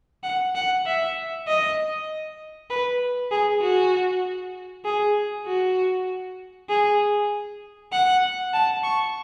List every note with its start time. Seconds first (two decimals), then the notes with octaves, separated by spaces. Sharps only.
0.23 F#5
0.55 F#5
0.86 E5
1.47 D#5
2.70 B4
3.31 G#4
3.62 F#4
4.85 G#4
5.46 F#4
6.69 G#4
7.92 F#5
8.53 A5
8.83 C#6